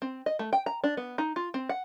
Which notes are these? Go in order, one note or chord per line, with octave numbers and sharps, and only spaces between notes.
C4
D#5
A3
G5
A#5
D4
B3
D#4
F4
C4
F#5